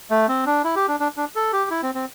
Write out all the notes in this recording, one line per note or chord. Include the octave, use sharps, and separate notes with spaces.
A3
C4
D4
E4
G4
D4
D4
D4
A4
G4
E4
C4
C4